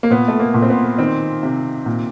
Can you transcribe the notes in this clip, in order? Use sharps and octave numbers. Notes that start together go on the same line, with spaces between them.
A#3
A#2 B3
A3
A#3
A#2
C4
B3
D#3 C4
C3
A#2